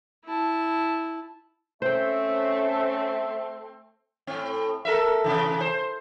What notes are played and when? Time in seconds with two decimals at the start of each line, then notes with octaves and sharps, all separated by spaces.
0.25 E4 A5
1.82 A3 C4 C#4 C5 E5 G5
4.27 A2 C4
4.85 A4 A#4 E5
5.24 C3 E3
5.61 C5